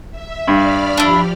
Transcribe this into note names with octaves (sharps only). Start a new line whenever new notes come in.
E5
G2 D5 B5 F6
F3 D4 E4 G4